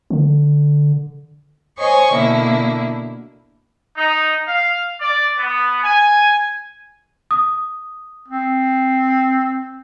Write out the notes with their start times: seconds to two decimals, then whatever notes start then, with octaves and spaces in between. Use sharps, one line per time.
0.10 D3
1.79 C5 C#5 D#5 G#5 C#6
2.13 B2 D3 A#3 E4
3.97 D#4
4.48 F5
5.00 D5
5.38 B3
5.84 G#5
7.31 D#6
8.28 C4